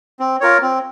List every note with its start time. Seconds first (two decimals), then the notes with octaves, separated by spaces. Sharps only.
0.20 C4
0.41 F4 A#4 C#5
0.62 C4